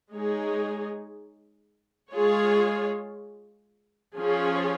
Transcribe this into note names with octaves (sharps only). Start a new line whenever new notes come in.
G#3 D#4 G#4 C#5
G#3 F4 G#4 C#5
F3 C#4 F4 G#4 C#5